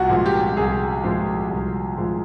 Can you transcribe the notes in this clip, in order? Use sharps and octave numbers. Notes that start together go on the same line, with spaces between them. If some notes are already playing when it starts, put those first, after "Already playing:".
Already playing: C2 F4 F#4
A#2 F3 G#3
G4
C2 G#4
A#2 F3 G#3
C2
A#2 F3 G#3